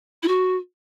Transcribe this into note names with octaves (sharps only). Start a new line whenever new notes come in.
E4
F#4